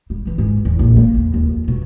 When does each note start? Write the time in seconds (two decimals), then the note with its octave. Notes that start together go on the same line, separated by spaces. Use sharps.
0.10 G3
0.27 E3
0.38 G#2
0.65 E2
0.79 A#1
0.96 A#3
1.14 E2
1.34 D#2
1.47 F2
1.68 B2